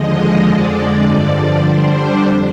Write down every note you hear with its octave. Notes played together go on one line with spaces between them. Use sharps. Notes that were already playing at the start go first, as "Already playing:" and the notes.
Already playing: D#2 D3 F3 G#3 D#5
F2 D3 G#3 D5
G2 D3 F3 D5
D3 G3 D4 C5
F2